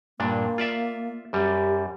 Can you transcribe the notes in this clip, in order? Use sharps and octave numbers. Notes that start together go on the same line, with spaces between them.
G2 A#2 A#3 D4
F4 D5 E5
F#2 G3 G4